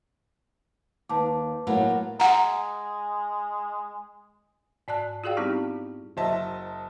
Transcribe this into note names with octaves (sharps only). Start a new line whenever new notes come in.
D#2 B4 A5 D6
A2 F#3 A#3
G#3 F#5 A#5
G#2 D5 A5 F#6
F4 F#4 G#4 D5 F5 G5
G3 B3 C4 D#4 E4 G4
F#1 F#3 C5 D#5 E5 A5